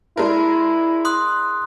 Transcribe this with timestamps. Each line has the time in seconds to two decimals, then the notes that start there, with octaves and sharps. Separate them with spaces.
0.17 G#3 D4 E4 A#4
1.05 C6 D#6 F#6